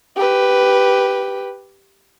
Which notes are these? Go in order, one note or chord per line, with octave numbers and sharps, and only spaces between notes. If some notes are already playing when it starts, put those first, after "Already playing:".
G4 B4